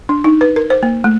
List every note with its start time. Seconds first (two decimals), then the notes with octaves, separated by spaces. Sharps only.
0.09 D4
0.24 D#4
0.41 B4
0.56 A#4
0.70 C5
0.83 A#3
1.04 A3